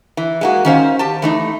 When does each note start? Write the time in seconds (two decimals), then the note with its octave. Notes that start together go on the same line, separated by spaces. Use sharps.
0.17 E3
0.41 G#3 A#3 F#4
0.65 D#3 C#4 C5 F5
0.99 G4 A5
1.22 E3 A3 D#4